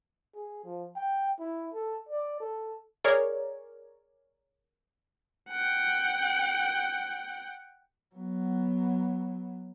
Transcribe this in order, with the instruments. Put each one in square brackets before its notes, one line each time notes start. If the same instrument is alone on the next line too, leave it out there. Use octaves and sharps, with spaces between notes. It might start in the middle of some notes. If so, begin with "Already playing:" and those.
[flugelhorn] G#4
F3
G5
E4
A4
D5
A4
[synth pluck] G#4 A#4 C#5 D5
[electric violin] F#5 G5
[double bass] F#3 B3